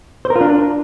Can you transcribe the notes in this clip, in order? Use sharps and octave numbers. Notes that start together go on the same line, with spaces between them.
C5
A#4
F4
D4